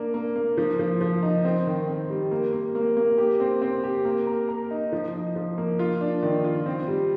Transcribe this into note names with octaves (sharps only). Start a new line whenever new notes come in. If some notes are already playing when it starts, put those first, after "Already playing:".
Already playing: A#3 D4
A#3
A#3
F3
F3
F3
D#4
C4
D#3
C4
G3
A#3
A#3
A#3
A#3
G4
C4
C4
G4
A#3
A#4
A#4
D#4
F3
D#4
F3
A#3
F4
D4
D#3
F4
C4
G3